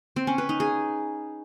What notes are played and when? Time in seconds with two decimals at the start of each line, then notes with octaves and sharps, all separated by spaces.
0.16 C4
0.27 C#4
0.38 B4
0.49 D#4
0.60 G#4